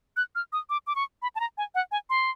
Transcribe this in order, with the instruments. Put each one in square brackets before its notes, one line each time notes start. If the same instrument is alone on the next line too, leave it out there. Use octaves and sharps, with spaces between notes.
[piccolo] F#6
F6
D#6
D6
D6
C#6
B5
A5
A#5
G#5
F#5
G#5
C6